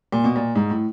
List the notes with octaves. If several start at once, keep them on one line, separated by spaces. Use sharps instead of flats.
A#2
B2
A#2
G#2
A2